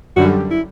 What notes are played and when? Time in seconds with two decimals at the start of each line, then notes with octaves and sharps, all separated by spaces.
0.16 F#2 D3 G3 F#4
0.51 E4